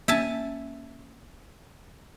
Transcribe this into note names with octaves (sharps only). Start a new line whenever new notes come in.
A#3 C#4 E5 G#5 A5